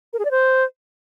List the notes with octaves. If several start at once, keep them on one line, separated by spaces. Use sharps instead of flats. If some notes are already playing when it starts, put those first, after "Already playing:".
A#4
G#4
D5
C5